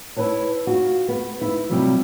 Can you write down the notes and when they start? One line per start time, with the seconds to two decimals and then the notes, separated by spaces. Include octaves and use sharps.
0.16 E4 B4 C#5 A5
0.67 F4 F#4
1.08 B3
1.41 E4
1.69 C3 F#3 G3 E4 F4